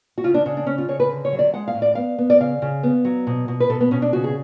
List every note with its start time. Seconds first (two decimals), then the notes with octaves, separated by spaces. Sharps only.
0.18 F#4
0.24 C#3 F4
0.34 D4
0.46 C#3 D4
0.57 D4
0.67 C#3 C#4
0.78 F4
0.88 C#3 C#5
1.00 B4
1.10 D3
1.25 C#5
1.33 F#3
1.39 D5
1.54 G#3 F#5
1.68 F5
1.75 A2
1.82 D5
1.95 B3 F5
2.18 B3
2.30 D5
2.40 C#3 F5
2.62 C#3
2.83 B3
3.05 F#3
3.27 B2
3.48 B2
3.60 B4
3.70 B2 A4
3.81 B3
3.91 B2 C#4
4.02 D4
4.13 C#3 F#4
4.24 G#4